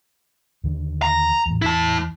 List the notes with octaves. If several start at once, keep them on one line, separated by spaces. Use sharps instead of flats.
D#2 D3 D#3
A#5
E2 A2
E2 E4 A5